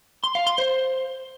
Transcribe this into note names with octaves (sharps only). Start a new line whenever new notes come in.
C6
F5
C6
C5